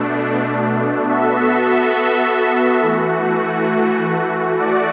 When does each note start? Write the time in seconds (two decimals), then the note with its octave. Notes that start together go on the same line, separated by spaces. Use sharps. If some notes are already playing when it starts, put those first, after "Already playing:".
Already playing: B2 A3 D4
1.06 B3 F#4 A4 E5
2.82 E3 A3 F#4
4.59 A3 F#4 D5